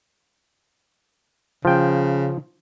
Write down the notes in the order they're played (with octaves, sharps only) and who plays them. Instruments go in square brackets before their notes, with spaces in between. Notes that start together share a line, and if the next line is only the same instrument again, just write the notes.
[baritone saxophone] C#3 [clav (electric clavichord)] F3 G5